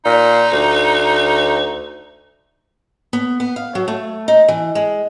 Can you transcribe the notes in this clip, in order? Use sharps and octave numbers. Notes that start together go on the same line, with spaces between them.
A#2 D#4
D2
B3
B3
F5
F#3
A3
D#4
E3
G#3